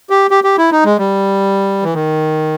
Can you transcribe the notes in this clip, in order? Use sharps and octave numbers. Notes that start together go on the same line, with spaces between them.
G4
G4
G4
E4
D#4
G#3
G3
E3
D#3